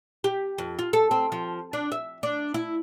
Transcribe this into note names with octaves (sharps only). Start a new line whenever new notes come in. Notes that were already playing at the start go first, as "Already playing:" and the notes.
G4
F2
F4
A4
C4
F3
D4
E5
D4
E4